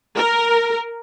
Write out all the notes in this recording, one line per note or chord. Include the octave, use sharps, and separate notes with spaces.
A#4